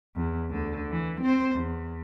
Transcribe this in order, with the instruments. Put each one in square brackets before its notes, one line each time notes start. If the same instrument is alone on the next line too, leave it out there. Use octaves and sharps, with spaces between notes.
[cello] E2
D2 D3
E3
C4 C5
E2